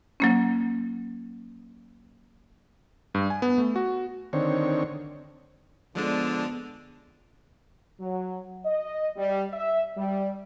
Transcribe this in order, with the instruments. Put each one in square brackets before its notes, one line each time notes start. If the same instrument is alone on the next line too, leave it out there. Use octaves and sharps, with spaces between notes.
[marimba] F#3 A#3 C#4
[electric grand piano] G2
G#5
B3
A3
F#4
[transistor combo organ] D3 D#3 C4 C#5
[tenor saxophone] D3 [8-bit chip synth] F3 G#3 D4 [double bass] B3
[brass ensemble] F#3
D#5
G3
E5
G3